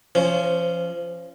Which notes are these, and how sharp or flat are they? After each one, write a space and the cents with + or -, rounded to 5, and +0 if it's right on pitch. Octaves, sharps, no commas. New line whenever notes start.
F3 -25 C#4 +0 C5 +0